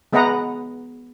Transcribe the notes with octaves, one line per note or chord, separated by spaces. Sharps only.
G#3 B3 B4 D#5 F#5 A#5